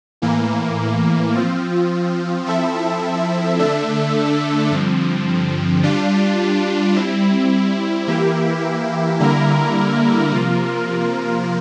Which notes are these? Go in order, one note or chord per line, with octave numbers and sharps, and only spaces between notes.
A2 E3 A#3
F3 C4 F4
F3 C4 E4 A4 E5
D3 A3 D4 A4 E5
G2 D3 F3 C4
G3 D4 F4
G3 C4 E4
E3 A#3 E4 G4
D3 G3 A#3 E4 A#4
C3 F3 A#3 F4 A#4